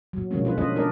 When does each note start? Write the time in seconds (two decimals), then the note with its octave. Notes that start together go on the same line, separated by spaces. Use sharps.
0.13 A#2 F#3
0.31 B2 D3 F3 G#3 A#3 C#4
0.45 F4 B4
0.58 C#4 D4 F4 B4 D#5
0.76 F3 D4 D#4 A#4 D5 D#5